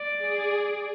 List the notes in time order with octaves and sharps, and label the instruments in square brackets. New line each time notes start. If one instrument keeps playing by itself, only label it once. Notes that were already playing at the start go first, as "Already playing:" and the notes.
Already playing: [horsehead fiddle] D5
[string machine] G#4